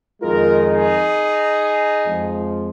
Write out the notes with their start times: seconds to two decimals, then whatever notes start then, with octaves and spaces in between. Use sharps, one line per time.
0.22 F2 D#3 G#3 F4 A#4
0.68 D#4 G#4
2.06 F2 F3 G#3